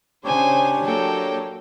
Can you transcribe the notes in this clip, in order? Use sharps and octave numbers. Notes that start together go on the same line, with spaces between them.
C#3 D4 G4 C5 C#5 G#5
F#3 A#3 A4 G5